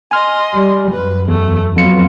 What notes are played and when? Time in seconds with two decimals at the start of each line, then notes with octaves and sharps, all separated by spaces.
0.11 D#5 G#5 C6 F6
0.55 G3
0.92 F#2 B4
1.28 E2 A3
1.76 F2 F#3 B3 F4 C#7